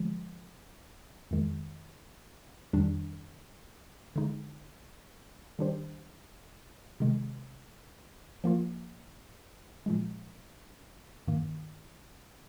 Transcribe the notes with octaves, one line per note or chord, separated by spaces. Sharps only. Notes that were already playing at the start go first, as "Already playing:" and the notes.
Already playing: D3 F3 G#3
F2 D#3 G#3
F2 D#3 G3 D4
D3 G#3 D#4
D#3 G3 D4 G4 C5
C3 D#3 G#3
F3 A#3 F4
A#2 F3 G#3
G2 D#3 A#3